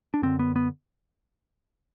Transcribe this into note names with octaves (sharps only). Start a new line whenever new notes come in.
D4
F#2 D3 C4
B3
B3